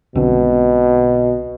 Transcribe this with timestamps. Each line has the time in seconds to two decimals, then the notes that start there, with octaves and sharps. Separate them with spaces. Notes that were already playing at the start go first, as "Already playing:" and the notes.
0.15 B1 B2 D3 C4